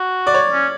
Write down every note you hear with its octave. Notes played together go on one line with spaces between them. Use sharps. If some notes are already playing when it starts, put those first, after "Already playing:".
Already playing: F#4
D5
C#5
C#4